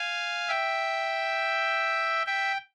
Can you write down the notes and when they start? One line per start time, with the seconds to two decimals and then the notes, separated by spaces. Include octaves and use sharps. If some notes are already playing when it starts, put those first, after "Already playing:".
Already playing: F5 G#5
0.48 E5 G5
2.26 E5 G5